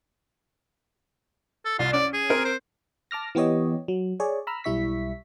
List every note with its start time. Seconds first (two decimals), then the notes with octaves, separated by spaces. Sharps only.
1.65 A4
1.79 C2 F4
1.93 C#4 D5
2.14 G#4
2.29 C4 A#4
2.45 C5
3.11 A5 D6 F6 A#6
3.35 E3 B3 G4 C#5 D#5
3.88 F#3
4.20 G#4 C#5 D5
4.47 A#5 B5 E6 F6
4.64 B1 G3 E4 E5 C#6 B6